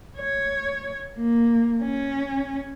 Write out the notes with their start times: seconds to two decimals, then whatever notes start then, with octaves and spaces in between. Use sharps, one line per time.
0.18 C#5
1.17 A#3
1.83 C#4